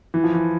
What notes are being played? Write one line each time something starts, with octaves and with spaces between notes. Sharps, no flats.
E3
F3
E3